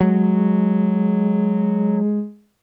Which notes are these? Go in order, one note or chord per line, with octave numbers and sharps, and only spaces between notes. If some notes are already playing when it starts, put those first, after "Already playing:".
F#3 G#3